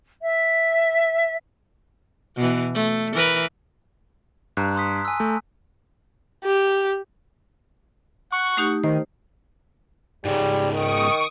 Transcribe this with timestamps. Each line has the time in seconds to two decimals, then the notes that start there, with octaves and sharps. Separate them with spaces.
0.22 E5
2.37 B2 E3
2.74 A3
3.15 E3 A#4 B4
4.57 G2 A5 A#5 F#6
4.76 C6 D#6 B6
5.05 G#5 E6
5.20 A3
6.44 G4
8.32 F#5 C#6
8.57 A3 D#4 G4
8.84 D#3 C5
10.25 G#2 C#3 G3
10.72 D#3 C#6 D#6 D7